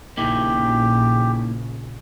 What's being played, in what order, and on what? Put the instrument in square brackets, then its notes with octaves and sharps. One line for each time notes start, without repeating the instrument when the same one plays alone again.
[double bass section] A#1 C#3 [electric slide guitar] A#3 D#4 E4 [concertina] G4